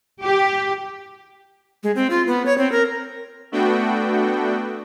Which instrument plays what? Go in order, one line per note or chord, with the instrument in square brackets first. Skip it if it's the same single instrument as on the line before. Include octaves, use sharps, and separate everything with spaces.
[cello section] G4
[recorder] G#3
C4
F4
B3
C#5
C4
A#4
[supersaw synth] A3 B3 D4 F#4 G5